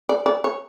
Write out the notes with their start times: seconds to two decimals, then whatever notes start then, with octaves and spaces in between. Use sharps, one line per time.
0.09 D5
0.26 D5
0.44 C#5